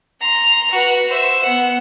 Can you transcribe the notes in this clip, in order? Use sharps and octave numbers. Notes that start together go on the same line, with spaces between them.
A#5 C6
F#4 B4
C5 E5
B3 F#5